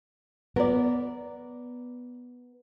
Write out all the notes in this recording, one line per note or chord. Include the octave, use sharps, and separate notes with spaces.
B3 A#4 D5